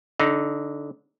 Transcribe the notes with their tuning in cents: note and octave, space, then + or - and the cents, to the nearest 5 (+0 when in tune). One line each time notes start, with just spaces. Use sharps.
D3 -20 D#4 +0